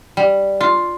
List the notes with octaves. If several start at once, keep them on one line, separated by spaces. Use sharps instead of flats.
G3
F4